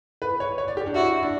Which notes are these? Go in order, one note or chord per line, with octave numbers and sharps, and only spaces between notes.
B4
C#5
C#5
D5
G4
D4
E4 F#4
E4
D4